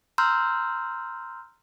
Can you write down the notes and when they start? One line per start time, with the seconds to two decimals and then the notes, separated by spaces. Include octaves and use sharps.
0.18 A#5 C6 E6 F6 G6